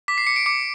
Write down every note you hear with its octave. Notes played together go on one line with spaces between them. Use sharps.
D6 B6
C7
D6 C#7
D7
D6 C#7